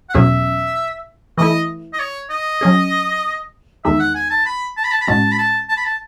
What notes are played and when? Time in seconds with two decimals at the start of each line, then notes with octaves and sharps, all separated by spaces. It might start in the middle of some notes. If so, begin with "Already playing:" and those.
0.09 F#5
0.14 E2 B2 F#3 C#4 G#4 E5
1.38 E3 A3 E4 D#5
1.93 D#5
2.00 C#5
2.30 D#5
2.61 F#3 C#4 G#4
3.84 E2 D#3 G#3 D#4 G#4 E5
4.00 F#5
4.15 G#5
4.30 A5
4.46 B5
4.77 A5
4.84 B5
4.91 A5
5.01 B5
5.07 A2 G#3 C#4 F#4 A5
5.32 B5
5.38 A5
5.69 A5
5.77 B5
5.85 A5